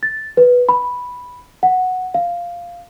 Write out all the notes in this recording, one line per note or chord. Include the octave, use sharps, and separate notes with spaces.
A6
B4
B5
F#5
F5